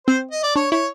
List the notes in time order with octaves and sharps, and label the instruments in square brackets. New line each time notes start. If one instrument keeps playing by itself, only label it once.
[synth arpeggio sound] C4 [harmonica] C5
[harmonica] D#5
D5
[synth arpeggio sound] D4 [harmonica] C#5
[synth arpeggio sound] E4 [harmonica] C#5